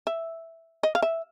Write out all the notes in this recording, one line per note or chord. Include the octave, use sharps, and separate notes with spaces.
E5
D#5
F5
E5